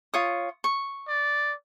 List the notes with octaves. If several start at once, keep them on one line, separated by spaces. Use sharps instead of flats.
F4 C#5 D#6
C#6
D5